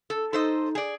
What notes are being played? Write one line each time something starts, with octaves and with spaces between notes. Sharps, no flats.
A4
D#4 A4 C5 D#5
G#4 D5